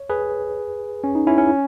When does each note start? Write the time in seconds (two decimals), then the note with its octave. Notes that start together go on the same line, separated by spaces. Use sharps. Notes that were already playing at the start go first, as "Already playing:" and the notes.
Already playing: C#5
0.10 G#4 B4
1.04 C#4
1.15 D#4
1.27 C#4 E4
1.38 C#4